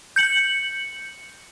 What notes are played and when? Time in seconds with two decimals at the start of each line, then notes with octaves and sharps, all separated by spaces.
0.16 G6 C#7 F#7